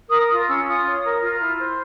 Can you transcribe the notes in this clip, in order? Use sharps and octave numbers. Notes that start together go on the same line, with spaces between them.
A#4 D#6
F4 D#6
C#4 E6
F4 D#6
C#5
A#4
F4
E4
C5